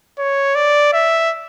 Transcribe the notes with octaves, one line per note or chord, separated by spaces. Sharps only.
C#5
D5
E5